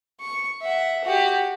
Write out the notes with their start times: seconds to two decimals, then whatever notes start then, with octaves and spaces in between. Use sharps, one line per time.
0.20 C#6
0.61 E5 F#5
1.05 F#4 G4